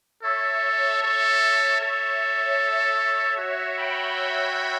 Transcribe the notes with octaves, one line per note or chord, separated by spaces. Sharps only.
A4 C#5 E5
A4
A4
F#4
G5 B5
E5 G5